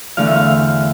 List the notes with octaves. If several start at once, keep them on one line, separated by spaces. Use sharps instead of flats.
E2 D3 A3 F5
E5
F5